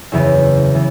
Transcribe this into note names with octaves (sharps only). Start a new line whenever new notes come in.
F#1 E2 C#3 E3 B3
C#3 E3 B3